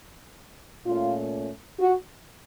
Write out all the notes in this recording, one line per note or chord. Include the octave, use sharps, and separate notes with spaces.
A#2 A3 C#4 F4
F#4